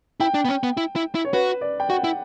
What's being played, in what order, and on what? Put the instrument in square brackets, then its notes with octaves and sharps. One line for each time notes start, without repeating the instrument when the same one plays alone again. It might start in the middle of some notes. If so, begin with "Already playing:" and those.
[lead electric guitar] E4 [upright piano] G5
[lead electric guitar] D4
B3
C#4
B3
E4
E4
E4
[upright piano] C#5
[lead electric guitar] F#4 [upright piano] B4
[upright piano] D5
G5
[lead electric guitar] F#4 [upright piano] F#5
[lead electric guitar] E4